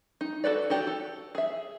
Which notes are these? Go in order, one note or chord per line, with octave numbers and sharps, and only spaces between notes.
D#4
F#4 A4 B4 D5
D#4 F#4 G4 D5
A4
G#4 E5